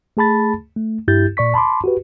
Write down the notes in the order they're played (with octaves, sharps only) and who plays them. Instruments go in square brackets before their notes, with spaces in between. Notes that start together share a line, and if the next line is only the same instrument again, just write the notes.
[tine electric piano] A3 G#4 A5 B5 A6
A3
G2 E4 G4 G6 A6
A#2 D5 C#6 B6
A5 B5 C6 D6
F#4 G4 B4